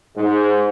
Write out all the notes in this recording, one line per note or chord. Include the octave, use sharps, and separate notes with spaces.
G#2